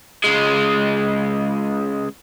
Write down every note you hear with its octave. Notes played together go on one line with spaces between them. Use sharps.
C#2 G#3